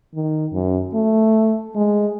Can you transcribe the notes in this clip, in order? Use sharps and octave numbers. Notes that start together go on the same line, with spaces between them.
D#3
F#2
A3
G#3